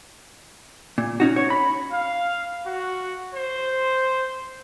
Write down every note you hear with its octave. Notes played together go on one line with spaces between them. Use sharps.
A#2
C#4 D#4 F#4
C#5
B5
F5
F#4
C5